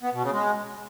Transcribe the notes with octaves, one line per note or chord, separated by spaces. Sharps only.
B3
B2
C#3
G#3